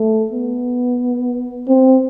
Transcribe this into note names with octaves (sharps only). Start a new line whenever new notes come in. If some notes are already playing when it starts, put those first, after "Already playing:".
Already playing: A3
B3
C4